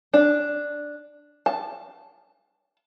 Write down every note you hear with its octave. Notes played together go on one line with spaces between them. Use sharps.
D4
A5